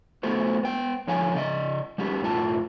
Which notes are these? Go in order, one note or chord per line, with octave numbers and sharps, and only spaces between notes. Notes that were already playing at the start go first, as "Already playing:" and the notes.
A3 B3 F#4 A4 C5
B3 G5
D2 D3 F3 C#5 F5 G#5
C#3 D5 D#5
G3 C#4 F#4 G4
B1 F#2 A2 F4 A5